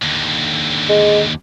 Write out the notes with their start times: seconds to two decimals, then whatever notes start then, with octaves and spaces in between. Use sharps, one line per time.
0.02 D#2 D3
0.89 G#3